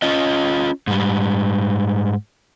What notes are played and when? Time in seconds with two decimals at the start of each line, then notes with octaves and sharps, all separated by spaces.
0.02 C#4 F4 D#5
0.87 G#2 G3